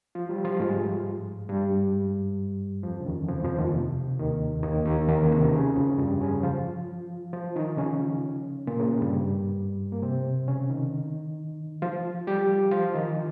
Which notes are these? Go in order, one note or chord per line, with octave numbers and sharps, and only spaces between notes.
F3 F4
G3 G4
F3 F4
G#2 G#3
G2 G3
F2 F3
C#3
D#2 D#3
F2 F3
F2 F3
D#2 D#3
C3
D#2 D#3
D#2 D#3
D#2 D#3
D#2 D#3
C#3
C3
C#3
F2 F3
G2 G3
C#3 C#4
F3 F4
F3 F4
D#3 D#4
C#3 C#4
A#2 A#3
C#3
G2 G3
A#3
C3 C4
C#3 C#4
D#3 D#4
F3 F4
G3 G4
F3 F4
D#3 D#4